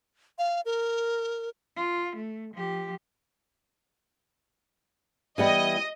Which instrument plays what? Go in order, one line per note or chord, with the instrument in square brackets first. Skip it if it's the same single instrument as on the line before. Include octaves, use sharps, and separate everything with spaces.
[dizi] F5
A#4
[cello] F4
A3
F3 G4
[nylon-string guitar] E3 G3 B3 [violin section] D#5